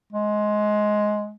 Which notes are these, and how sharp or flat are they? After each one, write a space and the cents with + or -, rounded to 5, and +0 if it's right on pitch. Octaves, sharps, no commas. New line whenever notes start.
G#3 +15